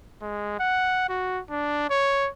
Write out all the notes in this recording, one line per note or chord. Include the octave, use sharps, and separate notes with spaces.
G#3
F#5
F#4
D4
C#5